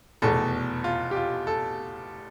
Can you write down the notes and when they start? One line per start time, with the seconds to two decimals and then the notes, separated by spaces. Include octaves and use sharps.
0.22 F1 E2 B2 A4
0.84 F4
1.11 G4
1.16 F4
1.47 A4